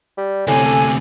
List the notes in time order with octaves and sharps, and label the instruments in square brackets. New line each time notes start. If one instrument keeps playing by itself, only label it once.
[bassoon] G3
[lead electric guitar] D2 C3 [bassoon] A2 [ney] G#5
[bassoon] A4